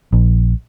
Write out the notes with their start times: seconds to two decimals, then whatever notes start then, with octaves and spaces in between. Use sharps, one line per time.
0.13 A#1